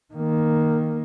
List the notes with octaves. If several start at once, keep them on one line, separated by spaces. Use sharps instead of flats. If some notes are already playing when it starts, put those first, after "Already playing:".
D#3 A#3